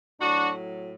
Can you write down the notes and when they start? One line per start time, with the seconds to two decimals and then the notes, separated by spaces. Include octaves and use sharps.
0.21 A2 F#3 D4 F#4